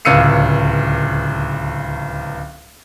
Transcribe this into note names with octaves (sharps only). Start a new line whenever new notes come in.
D1 C#2 F5 E6 C#7 D#7